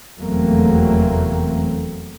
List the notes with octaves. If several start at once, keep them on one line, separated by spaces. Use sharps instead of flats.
F1 E2 F#3 A3 A#3 C4